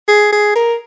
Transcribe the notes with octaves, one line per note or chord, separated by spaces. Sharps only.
G#4
G#4
A#4